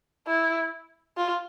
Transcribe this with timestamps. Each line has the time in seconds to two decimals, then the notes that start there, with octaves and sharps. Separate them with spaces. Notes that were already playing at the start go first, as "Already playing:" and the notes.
0.27 E4
1.17 F4